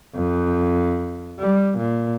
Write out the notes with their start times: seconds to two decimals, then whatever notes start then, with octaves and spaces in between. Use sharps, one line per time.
0.15 F2
1.39 G3
1.78 A#2